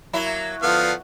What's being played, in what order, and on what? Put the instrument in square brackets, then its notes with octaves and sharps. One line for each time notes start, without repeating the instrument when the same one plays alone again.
[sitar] F#3 A#3 E4
[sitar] D3 [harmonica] F3 B3 F5